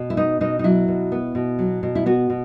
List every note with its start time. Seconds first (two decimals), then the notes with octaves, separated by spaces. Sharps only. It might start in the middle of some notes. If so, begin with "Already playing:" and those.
Already playing: B2
0.10 E4
0.17 B3 D#4
0.41 B2 D#4
0.59 D#4
0.64 F#3 E4
0.88 B2
1.12 B3
1.35 B2
1.59 F#3
1.83 B2
1.95 E4
2.06 B3 F#4
2.30 B2